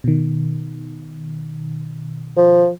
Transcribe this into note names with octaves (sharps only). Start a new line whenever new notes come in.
B2 D#3
F3